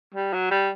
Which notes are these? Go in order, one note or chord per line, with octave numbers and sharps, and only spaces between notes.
G3
F#3
G3